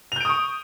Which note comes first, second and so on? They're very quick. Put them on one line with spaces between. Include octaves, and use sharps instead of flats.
F7 G6 D7 D#6 C#6